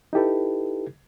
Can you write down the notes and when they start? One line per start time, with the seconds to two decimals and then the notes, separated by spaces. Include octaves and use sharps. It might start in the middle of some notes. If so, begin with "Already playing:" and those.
0.13 D#4 E4 G4 A4 B4